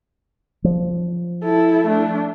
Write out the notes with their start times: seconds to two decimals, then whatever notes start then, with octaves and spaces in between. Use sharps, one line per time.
0.64 F3
1.44 E4 A4
1.87 A3 D4